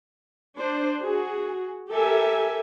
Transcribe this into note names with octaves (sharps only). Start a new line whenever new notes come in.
D4 C5
F#4 G#4
G4 A4 A#4 E5 G#5